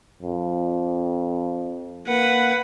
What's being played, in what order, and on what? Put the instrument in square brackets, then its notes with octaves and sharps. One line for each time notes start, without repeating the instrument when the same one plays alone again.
[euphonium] F2
[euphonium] A#3 [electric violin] B4 F#5